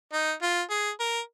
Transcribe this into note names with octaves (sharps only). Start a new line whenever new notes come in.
D#4
F4
G#4
A#4